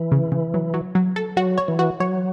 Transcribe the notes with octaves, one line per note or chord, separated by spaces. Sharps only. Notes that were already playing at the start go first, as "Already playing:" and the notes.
Already playing: E3
C#3
C#3
F#3
F#3
F#3
A4
F#3 F#4
C#5
E3
F#4
F#3 C#5